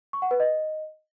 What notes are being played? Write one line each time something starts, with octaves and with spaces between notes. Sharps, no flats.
C#6
F#5
B4
D#5